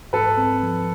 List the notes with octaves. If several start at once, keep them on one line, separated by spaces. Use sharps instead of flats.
G#2 A4 B4
C4
F3